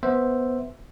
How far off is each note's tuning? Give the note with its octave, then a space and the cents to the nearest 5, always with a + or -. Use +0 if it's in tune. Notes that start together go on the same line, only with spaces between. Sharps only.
B3 +0 C5 +0 E5 +0